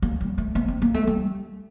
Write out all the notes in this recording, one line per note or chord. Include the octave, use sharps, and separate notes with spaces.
A#3
G3
A3
A#3
C4
A#3
A3
G3